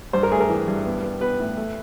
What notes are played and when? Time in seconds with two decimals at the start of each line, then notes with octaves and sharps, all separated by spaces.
0.13 G2 C5
0.23 A#4
0.31 A3 G#4
0.40 A#4
0.50 E3
0.68 G2
0.85 B3
1.03 B3
1.21 B3 B4
1.39 A2
1.57 A3